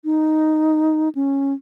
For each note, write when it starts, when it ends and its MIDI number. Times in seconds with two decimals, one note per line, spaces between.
0.05 1.09 63
1.15 1.53 61